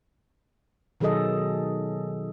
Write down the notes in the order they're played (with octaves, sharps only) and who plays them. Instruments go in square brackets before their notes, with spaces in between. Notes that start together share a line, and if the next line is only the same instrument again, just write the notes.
[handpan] B2 D#3 F#3 G#4 A4 D#5